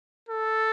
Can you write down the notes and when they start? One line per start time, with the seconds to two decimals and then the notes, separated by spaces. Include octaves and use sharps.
0.29 A4